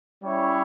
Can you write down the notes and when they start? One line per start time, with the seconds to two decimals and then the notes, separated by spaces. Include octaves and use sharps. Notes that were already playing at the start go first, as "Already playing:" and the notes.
0.23 G3 C#4 E4 C#5